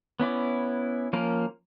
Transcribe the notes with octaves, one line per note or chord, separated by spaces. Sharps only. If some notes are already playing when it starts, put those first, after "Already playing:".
B3 C#4 E4 D5
F3 A#3 C#4 A#4